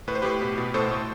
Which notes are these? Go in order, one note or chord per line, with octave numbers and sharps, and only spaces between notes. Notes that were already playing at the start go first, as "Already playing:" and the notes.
A2 B4
C5
A2 G4 B4
B2
B2
A2 A4 C5
A2